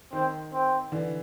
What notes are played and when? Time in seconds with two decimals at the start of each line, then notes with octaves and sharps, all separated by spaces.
0.12 D#3 C4
0.53 C4
0.92 D3 E3